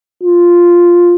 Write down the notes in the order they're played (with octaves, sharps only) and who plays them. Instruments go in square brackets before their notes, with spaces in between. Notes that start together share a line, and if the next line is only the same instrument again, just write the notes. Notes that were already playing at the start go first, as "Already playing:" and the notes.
[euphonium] F4